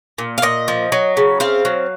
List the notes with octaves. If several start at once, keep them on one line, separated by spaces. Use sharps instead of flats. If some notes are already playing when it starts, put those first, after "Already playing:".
A#2
F5
A#2 D#5
F3
F#3
C#3
C4 F5
F#3